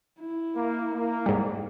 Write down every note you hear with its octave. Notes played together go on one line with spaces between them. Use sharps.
E4
A#3
A#3
G#2 G3